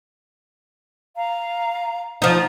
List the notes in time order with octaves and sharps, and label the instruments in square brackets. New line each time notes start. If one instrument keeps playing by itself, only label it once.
[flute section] F5 A#5
[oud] F3 D#4 [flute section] C5 F#5 A#5